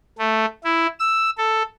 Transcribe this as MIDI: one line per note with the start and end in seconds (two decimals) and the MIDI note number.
0.19 0.46 57
0.64 0.87 64
0.99 1.30 88
1.38 1.63 69